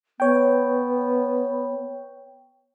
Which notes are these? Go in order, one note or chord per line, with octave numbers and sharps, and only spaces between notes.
B3 C#5 G5